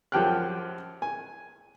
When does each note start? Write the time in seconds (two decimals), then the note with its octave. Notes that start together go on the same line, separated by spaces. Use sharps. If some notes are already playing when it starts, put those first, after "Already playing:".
0.12 F#2 F3 G4 G5 F6 F#6
1.02 G#5